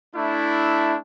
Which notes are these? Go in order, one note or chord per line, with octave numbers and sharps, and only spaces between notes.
A3 D4 E4